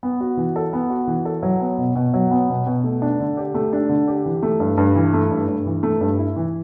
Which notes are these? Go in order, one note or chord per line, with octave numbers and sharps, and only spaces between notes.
B3
F#4
E3
A4
B3
F#4
E3
A4
F#3
B3
B2
B2
F#3
B3
B2
B2
A3
D4
D3
G4
A3
D4
D3
G4
E3
A3
G2
G2
E3
A3
G2
G2
E3
A3
G2
E4
E3